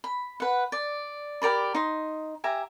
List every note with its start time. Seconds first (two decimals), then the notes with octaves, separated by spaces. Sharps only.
0.04 B5
0.40 B4 F#5
0.72 D5
1.42 G4 A#4 D5 B5
1.75 D#4 C6
2.44 G4 E5 G#5 A#5